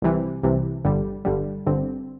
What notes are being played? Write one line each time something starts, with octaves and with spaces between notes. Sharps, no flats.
C2 C3 E3
C2 C3 E3
G1 G2 D3 G3
G1 G2 D3 G3
G1 G2 D3 C4